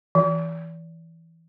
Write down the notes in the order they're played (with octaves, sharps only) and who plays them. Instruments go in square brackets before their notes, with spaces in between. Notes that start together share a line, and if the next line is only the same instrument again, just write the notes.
[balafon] E3